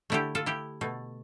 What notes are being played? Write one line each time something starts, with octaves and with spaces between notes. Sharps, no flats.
D3 A3 E4 G4
F4 A4
E4 G4
B2 A3